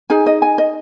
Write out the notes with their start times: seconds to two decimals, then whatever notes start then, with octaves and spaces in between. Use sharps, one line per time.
0.10 D#4 G#4 G#5
0.26 D#5
0.42 G#5
0.58 D#5